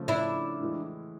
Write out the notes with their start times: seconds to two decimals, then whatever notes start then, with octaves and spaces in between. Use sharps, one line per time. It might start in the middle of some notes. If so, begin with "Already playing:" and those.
Already playing: C#3 F3 A3
0.08 D4 E4
0.60 A2 E3 G#3